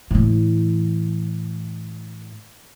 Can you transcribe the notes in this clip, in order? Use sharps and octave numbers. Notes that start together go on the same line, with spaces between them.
A2 E3